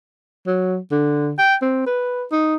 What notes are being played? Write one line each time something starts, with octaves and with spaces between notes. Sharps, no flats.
F#3
D3
G5
C4
B4
D#4